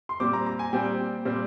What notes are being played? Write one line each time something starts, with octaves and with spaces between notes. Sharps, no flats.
C6
A#2 G3 C4 D6
A#5
A#5
G#5
A#2 G3 C4 G5
A#2 G3 C4